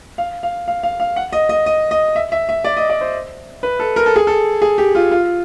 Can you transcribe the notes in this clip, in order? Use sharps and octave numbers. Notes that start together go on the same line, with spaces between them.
F5
F5
F5
F5
F5
F#5
D#5
D#5
D#5
D#5
E5
E5
E5
D5
D#5
D5
C5
B4
A4
A#4
A4
G#4
A4
G#4
G4
F4
F4